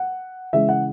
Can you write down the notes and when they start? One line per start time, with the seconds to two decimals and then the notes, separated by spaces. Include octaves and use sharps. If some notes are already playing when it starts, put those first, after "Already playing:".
Already playing: F#5
0.53 C#3 E3 G#3 E5
0.69 F#5